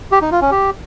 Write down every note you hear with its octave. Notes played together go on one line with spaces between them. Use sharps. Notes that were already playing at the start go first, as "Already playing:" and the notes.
G4
D#4
F4
C#4
G4